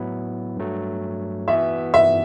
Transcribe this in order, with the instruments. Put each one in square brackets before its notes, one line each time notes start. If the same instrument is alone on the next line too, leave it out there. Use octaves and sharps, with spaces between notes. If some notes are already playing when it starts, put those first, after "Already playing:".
Already playing: [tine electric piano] A2 F#3 B3 E4
G2 F#3 A3
[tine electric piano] E3 B3 F#4 [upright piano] E5
[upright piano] E5